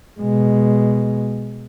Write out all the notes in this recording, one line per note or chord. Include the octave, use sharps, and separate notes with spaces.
B2 G#3